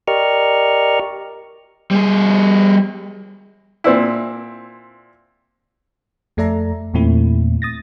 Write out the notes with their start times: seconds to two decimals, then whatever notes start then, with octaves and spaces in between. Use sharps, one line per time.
0.08 G4 A#4 D5 D#5 C#6 F6
1.91 G3 G#4
3.84 A#2 C4 D4 E4
6.37 F2 A3 A4 D5 E5 A#5
6.94 E2 A#2 A3 C4 E4
7.62 D#6 A6 A#6